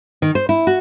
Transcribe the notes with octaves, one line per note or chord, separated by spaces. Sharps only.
D#3
C5
E4
F#4